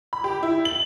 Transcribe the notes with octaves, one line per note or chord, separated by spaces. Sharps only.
B5
G4
E4
F#7